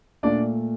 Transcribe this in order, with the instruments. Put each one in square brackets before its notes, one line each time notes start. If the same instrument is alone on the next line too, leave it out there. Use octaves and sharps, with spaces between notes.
[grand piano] A#2 A3 D4 D5